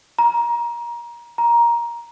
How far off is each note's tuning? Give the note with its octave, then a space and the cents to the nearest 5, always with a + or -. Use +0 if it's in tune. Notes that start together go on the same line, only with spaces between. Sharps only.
A#5 +25
A#5 +15